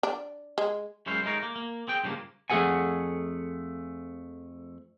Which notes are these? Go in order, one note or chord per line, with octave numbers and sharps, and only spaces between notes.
D4
G#3
F#2 G#3 C#4 E4 C5 F5
G#3 A3 D#4 A#4 C#5
A#3
A#3
C4 G#4 G5
G2 C#3 F3 A3 A#3
F2 A3 G#4 A4 F#5 G#5